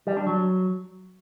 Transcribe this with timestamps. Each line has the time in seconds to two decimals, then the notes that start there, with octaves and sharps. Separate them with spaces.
0.07 G3
0.17 D4
0.27 F#3